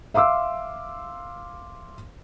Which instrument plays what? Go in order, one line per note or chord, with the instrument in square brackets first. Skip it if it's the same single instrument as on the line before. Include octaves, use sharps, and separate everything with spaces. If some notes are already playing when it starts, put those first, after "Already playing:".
[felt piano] E5 F5 C6 D6 E6